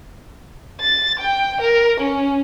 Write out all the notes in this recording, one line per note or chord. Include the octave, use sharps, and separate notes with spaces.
A6
G5
A#4
C#4